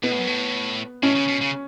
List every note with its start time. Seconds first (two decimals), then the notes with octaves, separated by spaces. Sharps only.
0.03 B2 B3
0.11 A2
0.19 F#2
0.27 A2
1.03 A2 C#4
1.15 C#3
1.28 B2
1.41 C#3